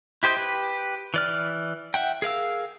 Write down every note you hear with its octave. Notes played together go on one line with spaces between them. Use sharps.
E4 G4 C5 D#5 G5
G4 B4
E3 D5 F6
E5 F#5 G5
G#4 A#4 F5 E6